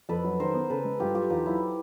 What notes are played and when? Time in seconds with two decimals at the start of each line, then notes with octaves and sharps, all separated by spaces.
0.09 F2 A4 B4
0.24 F#3
0.40 D#3 A#4 C5
0.54 B3
0.70 C#3 A4 B4
0.85 G#3
1.00 G2 F4 G4
1.14 F#3 F4 G4
1.30 E2 D#4 F4
1.46 F#3 E4